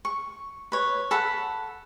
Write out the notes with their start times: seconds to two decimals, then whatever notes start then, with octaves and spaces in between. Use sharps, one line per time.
0.05 C#6
0.72 B4 C#5
1.11 A4 F#5 B5